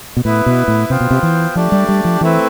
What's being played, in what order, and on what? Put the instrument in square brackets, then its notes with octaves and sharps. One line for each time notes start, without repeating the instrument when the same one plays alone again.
[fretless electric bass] B2
[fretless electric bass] A2 [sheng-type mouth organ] B3 E4 B4
[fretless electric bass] B2
A2
[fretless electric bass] C3 [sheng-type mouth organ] B3 F4 C5 G5
[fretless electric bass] B2
C3
E3
[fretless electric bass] F3 [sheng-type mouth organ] A3 D4 G4 D5 A5
[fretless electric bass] G3
G3
F3
[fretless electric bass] E3 [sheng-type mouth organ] A3 C4 E4 B4